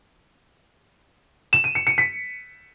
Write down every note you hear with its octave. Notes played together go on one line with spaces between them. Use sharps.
E7
D#7
C#7
C#7
B6